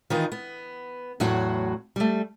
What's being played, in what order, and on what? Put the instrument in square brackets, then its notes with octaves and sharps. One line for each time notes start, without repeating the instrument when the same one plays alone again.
[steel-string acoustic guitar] D#3 E3 D#4 F4
B3
E2 A2 F#3 F#4 F#5
G3 A3